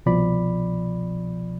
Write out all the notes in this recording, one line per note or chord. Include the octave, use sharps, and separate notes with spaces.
C2 B2 F3 D5 B5